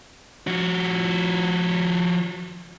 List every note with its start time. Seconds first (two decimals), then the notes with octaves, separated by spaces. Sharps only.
0.47 F3 F#4